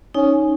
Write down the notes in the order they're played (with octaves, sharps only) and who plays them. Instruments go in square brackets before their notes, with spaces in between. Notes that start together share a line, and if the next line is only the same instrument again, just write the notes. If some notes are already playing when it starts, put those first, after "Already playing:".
[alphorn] C#4 [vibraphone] D#4